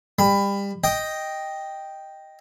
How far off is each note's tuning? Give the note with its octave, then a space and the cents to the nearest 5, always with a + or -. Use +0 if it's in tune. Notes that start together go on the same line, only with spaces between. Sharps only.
G3 +30 B5 +15
D#5 +0 G5 +0